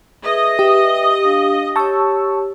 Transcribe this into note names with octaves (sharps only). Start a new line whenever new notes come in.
G#4 B4 D#5 E5
G4 B4 E5 D#6
D4 F5
G4 C#5 A5 C#6 E6